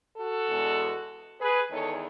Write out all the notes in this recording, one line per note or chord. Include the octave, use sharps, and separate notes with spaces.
F#4 A4
E2 B2 G#3
G#4 B4
E2 D#3 G#3 A4 C#5